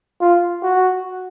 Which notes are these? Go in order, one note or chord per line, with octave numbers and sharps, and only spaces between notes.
F4
F#4